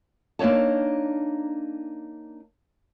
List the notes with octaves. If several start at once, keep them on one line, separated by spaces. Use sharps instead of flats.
A#3 D4 D#4 C#5 A5